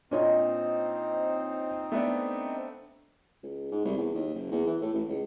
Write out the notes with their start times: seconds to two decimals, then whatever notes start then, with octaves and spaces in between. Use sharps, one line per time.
0.11 A#2 C4 D4 D#4 C#5 D#5
1.92 A3 B3 D4
3.43 C#2
3.72 G#2
3.85 C2
3.97 E2
4.15 D#2
4.34 F#1
4.51 E2
4.67 E3
4.81 A2
4.93 A1
5.09 C#2